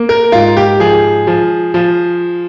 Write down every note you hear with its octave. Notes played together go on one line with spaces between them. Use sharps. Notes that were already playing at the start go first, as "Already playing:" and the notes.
Already playing: A#3
A#4
G#2 F4
G4
F3 G#4
F3
F3